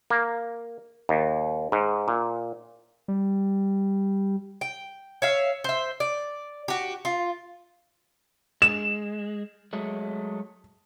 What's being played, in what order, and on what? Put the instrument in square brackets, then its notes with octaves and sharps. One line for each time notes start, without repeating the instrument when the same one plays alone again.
[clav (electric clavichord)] A#3
D#2
G#2
A#2
[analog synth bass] G3
[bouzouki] G5
C#5 E5 F5
C5 E5
D5
F#4 G4
F4
[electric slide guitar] G#3 [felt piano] E7
[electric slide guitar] F#3 G#3 A3